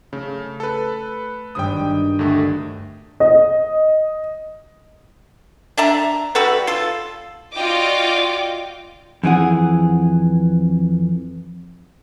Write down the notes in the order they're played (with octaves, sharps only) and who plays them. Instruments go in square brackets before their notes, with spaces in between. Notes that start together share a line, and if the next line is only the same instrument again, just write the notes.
[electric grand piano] C#3 [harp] A3
[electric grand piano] A4 B4
[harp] G#1 G2 D#3 [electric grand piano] G5 D#6
[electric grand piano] D2 D3 A3
[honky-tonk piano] D#5
[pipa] D4 E5 A5 A#5
G3 F#4 A4 B4
F4 A4
[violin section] F4 F#4 D5 D#5 G5 D6
[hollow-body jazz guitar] F2 E3 G#4 F#5